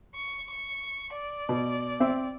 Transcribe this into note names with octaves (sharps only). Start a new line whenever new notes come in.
C#6
C#6
D5
B2
C4 E5